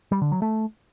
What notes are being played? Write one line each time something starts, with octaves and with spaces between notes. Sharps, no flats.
G3
D3
F#3
A3